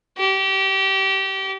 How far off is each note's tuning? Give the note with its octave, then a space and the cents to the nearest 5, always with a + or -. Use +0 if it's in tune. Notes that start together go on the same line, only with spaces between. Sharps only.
G4 -25